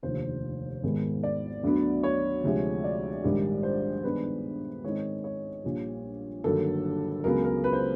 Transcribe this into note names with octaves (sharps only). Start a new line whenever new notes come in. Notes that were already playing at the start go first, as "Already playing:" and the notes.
F1 D#2 D3 F3 C5
G#1 G#2 D#3 G#3 B3
D5
D2 D3 F#3 B3 D4
C#5
D2 C3 F3 G#3
D5
A#1 G#2 D#3 G3
C5
G2 D#3 G#3 B3 D4 B4
G#2 D#3 G#3 C4 D#4 C#5
C#5
A#1 A#2 G3
G1 G2 D#3 F#3 A#3 A4
C#2 C#3 F#3 B3 A#4
A#4
B4
C5